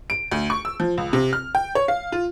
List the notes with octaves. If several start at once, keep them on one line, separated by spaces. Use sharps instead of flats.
D7
D2
C#6
E6
F3
C#2
C3
F6
G5
C#5
F5
F4